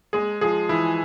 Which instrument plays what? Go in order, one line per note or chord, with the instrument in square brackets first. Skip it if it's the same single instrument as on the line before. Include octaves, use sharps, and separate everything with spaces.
[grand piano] G#3 [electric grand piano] G#4
[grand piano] F3 [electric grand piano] G#4
[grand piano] E3 [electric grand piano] E4